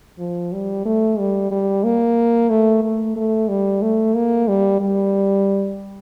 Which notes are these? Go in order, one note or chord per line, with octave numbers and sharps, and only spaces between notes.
F3
G3
A3
G3
G3
A#3
A3
A3
A3
G3
A3
A#3
G3
G3